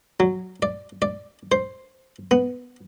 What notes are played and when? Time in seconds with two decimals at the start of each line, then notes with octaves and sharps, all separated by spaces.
0.20 F#3
0.62 D5
1.02 D5
1.52 C5
2.31 B3